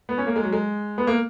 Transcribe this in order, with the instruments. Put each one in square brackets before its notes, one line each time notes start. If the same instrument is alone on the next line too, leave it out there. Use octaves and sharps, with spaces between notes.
[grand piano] B3
C#4
A#3
G#3
F#3
G#3
B3
A#3